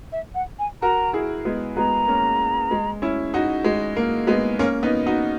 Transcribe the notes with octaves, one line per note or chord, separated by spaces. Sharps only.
E5
F#5
G#5
F#4 A#4 A#5
E4 G#4
G#3 B3
G#3 B3 A#5
A#3 C#4
G#3
C#4 E4
D#4 F#4
G#3
A#3
G#3 B3
A#3 C#4
B3 D#4
D#4 F#4